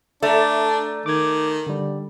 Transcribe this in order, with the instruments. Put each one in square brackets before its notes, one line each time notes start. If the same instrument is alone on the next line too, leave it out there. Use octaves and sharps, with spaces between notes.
[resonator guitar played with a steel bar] A3 [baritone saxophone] D4 [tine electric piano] D5 A#5
[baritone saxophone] D#3 [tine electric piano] D6 G#6
[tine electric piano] D3 G3